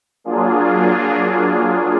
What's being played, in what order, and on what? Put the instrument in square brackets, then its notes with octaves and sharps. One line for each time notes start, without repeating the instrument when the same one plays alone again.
[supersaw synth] F#3 A#3 D4 F4 G#4